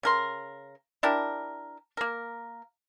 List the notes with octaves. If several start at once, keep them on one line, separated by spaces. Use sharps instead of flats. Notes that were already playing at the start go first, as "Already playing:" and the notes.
C#3 A#4 C6
D4 E4 G4 A#4
A#3 A#4